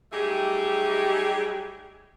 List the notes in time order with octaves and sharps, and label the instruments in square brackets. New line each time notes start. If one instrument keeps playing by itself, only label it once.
[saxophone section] F#3 G3 A3 D#4 G4 G#4